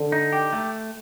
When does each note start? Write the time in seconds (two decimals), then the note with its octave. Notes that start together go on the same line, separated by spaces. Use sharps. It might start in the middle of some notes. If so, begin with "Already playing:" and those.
Already playing: D3
0.12 D#4
0.33 G4
0.53 A3